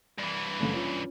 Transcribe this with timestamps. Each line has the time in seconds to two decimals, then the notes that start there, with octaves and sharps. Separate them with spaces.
0.18 G2 E3
0.61 F#1 A3
0.74 C#4 F4